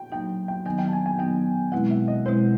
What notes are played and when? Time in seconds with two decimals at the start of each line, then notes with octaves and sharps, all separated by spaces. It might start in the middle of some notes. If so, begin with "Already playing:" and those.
Already playing: G5
0.12 F#3 A#3 D#4 G5
0.48 G5
0.65 D#3 F#3 B3 D#4 G#5
0.78 G5
0.88 A5
0.93 G#5
1.06 G#5
1.18 D#3 F#3 B3 D#4 G5
1.72 B2 G#3 C4 E4 F#5
1.91 E5
2.08 D#5
2.26 B2 G#3 C4 E4 C5